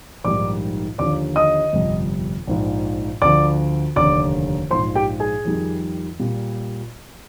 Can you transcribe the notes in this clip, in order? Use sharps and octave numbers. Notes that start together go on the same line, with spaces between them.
A#1 G#2 D#3 G3 D5 D6
D#2 D3 F3 D5 D6
D#5 D#6
G1 F2 C3 G3
A#1 G#2 F3
D2 D3 F3 D5 D6
F1 D#2 D3 D5 D6
A#1 G#2 F3 C5 C6
G4 G5
G#4 G#5
F2 D#3 G3
A#2 G3